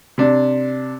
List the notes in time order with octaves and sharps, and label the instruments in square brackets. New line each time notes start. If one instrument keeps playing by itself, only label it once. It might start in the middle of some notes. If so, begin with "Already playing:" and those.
[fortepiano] C3 D4